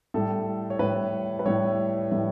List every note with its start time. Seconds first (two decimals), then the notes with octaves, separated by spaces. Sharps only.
0.14 A2 G3 A4
0.70 C#5
0.79 A2 G3 B4
1.39 B4
1.45 A2 G3 C#5
2.11 A2 G3